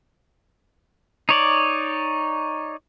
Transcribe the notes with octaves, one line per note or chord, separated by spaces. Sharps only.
D#4 C#5 D5